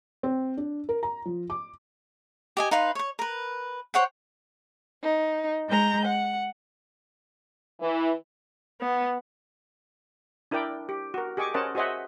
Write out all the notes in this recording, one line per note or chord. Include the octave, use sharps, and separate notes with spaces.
C4
D4
A#4
A#5
F3
D6
G4 D#5 G#5
D#4 B4 F5 C6
C#5 C#6
A#4 B4
C5 C#5 F#5 G5
D#4
G#3 A#5 G6
F#5
E3
B3
D4 E4 A#4 D5 G5
G4
F#4 A#4
G4 G#4 D#5 C#6 D6
C#4 A#4 C5 D#5 F#5 A5
F#4 G#4 C5 D#5 E5 F#5